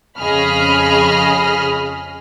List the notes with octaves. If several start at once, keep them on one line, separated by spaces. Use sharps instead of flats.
F2 C#3 G#4 D#5 B5 F6